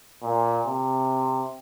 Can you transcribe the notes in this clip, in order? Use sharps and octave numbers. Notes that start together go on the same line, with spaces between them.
A#2
C3